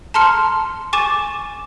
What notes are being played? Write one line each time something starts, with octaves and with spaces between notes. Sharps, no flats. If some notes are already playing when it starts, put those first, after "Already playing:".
A5 A#5 C6 F6 C#7
G#5 C#6 D6 A6 E7